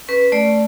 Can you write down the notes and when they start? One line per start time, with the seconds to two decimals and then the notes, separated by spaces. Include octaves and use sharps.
0.08 C#4 B4
0.32 A3 D5